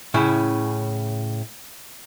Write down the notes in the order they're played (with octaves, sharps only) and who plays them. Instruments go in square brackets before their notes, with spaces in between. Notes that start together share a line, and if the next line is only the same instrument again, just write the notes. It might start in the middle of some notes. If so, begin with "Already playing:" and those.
[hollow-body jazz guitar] A2 C#3 C#4 E4